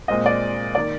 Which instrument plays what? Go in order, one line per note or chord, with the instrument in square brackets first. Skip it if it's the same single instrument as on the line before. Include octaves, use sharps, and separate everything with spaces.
[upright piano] A#2 G#3 C4 D#5
D5
D#3 A#3 D5